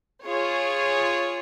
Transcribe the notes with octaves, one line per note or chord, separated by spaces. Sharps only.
F4 G#4 C#5